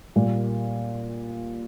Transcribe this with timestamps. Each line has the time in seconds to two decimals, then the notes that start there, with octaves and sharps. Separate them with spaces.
0.16 A#2 G3 A#3